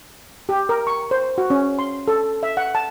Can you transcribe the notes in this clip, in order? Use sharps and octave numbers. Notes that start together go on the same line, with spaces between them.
G4
A#4
C#6
C5
F#4
C#4
C6
A4
E5
F#5
A5